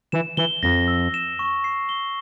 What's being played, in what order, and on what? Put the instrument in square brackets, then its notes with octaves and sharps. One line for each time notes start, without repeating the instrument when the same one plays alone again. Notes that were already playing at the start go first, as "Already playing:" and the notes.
[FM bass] E3 [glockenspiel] E7
[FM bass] E3 [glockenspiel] G7
[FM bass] F2 [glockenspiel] A#6
[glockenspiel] E6
E7
C#6
C7
G7